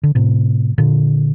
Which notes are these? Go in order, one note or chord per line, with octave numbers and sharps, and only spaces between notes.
D3
A2 C3
A#2 D3